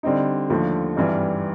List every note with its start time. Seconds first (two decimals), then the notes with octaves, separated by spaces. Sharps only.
0.03 D3 G3 C4 D#4
0.50 D#2 D3 F3 A3
0.96 G#1 G2 E3 G3